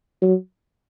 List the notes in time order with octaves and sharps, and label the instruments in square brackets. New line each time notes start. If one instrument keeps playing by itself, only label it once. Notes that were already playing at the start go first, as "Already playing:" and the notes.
[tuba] F#3